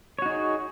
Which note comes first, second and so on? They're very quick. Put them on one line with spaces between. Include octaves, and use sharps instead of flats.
C#5 F#4 D#4 G#4